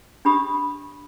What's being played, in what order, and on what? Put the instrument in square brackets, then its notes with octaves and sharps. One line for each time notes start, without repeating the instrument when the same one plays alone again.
[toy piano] D4 G4 B5 D#6